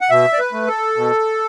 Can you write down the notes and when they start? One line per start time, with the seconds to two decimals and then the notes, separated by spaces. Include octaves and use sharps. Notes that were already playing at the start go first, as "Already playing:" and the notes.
0.01 F#5
0.10 B2 E5
0.33 D5
0.39 B4
0.53 A3
0.67 A4
0.97 B2